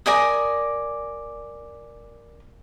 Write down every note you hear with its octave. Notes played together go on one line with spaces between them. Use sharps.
A#4 D5 G#5 D#6